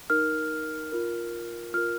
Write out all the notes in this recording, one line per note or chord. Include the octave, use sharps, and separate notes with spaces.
D#4 A#4 F6
F4 A#4
F4 A#4 F6